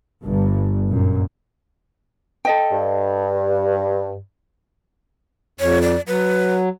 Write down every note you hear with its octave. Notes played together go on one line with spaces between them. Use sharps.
G1 G2
F#2 A#2
A4 D#5 G5
G2
F2 C#5
D5
F#3 B4